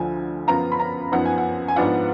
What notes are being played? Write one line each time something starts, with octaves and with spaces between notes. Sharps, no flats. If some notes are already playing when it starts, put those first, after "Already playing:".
Already playing: D2 D3 F3 G#5
F#2 F3 B3 F4 A#5
B5
A#5
F#2 F3 B3 D#4 F#5
G#5
F#5
G#5
G#2 F3 B3 D4 F4 F#5